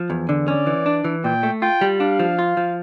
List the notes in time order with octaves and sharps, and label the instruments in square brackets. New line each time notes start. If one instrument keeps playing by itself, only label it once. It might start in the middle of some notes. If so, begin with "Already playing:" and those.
Already playing: [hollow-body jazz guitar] F3
E2
D3
[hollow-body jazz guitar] C#4 [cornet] D5
[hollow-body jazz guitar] E3
D4
E3
[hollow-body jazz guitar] A#2 [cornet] G5
[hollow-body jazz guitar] A3
[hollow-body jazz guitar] F4 [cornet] G5
[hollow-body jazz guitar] G3
[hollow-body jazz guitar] D4 [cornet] F5
[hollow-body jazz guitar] F3
F4
F3